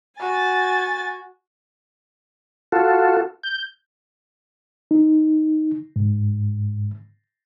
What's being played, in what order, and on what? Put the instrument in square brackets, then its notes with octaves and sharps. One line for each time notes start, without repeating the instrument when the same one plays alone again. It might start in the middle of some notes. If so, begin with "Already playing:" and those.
[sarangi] F#4 [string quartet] G#5 A6
[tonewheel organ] F4 F#4 A4
G6
[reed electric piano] D#4
G#2